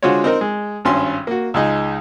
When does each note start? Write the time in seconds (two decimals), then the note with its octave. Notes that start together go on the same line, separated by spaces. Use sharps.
0.03 D3 G#3 F4 F#4 C5 C#5
0.24 C4 D#4 A#4
0.41 G#3
0.85 G#1 G2 C#4 C6
1.27 A#3 F#4
1.54 C#2 G#3 D#4